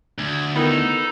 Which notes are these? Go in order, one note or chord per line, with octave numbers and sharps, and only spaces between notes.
D2 G#6
D#3 B3 D#4 E4 A4